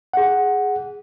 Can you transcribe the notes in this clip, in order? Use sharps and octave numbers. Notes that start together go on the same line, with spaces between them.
G#4 F#5